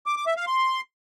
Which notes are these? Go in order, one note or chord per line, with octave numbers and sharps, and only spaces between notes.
D6
D6
E5
F5
C6